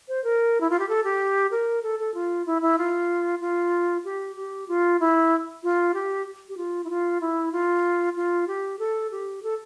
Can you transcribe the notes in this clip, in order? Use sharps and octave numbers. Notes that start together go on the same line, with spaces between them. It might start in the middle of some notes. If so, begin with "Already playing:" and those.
C5
A#4
E4
F4
G4
A4
G4
A#4
A4
A4
F4
E4
E4
F4
F4
G4
G4
F4
E4
F4
G4
G4
F4
E4
F4
E4
F4
F4
G4
A4
G4
A4